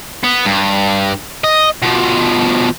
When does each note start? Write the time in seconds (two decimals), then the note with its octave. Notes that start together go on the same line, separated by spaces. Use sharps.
0.24 B3
0.46 G2
1.44 D#5
1.82 B2 F3